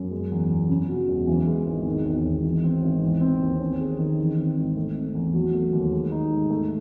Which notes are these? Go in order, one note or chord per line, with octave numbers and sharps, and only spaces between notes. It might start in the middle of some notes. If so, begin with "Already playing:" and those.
Already playing: F#2
G#3
E2
E2
C#3
F#3
E1
E3
G#3
G#1
D#3
E1
E1
E3
C4
G#1
E3
C4
D#2
C#4
G#4
D#3
E3
C4
G#1
A3
C4
E2
F#3
A3
D#2
G#3
D#4
G#2
A3